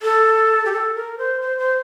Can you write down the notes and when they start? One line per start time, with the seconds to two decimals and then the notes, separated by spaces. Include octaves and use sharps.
0.03 A4
0.65 G4
0.72 A4
0.95 A#4
1.18 C5
1.41 C5
1.58 C5